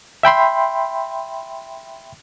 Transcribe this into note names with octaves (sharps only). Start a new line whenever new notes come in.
E5 G5 B5 C6